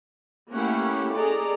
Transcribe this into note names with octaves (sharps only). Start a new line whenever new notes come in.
A3 A#3 C#4 E4 G4 F#5
G#4 A4 D5 D#5 A#5